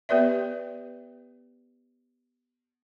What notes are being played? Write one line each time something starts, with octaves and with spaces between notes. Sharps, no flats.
B3 G4 B4 D5 E5